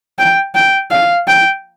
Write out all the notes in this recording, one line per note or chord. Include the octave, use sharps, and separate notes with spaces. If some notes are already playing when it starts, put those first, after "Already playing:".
G5
G5
F5
G5